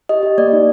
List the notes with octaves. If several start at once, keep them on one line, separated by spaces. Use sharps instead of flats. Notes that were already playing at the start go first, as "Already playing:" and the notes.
G4 D#5
G4
A#3 D5
D#4